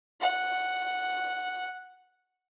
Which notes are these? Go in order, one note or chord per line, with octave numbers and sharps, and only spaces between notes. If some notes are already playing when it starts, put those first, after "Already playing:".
F#5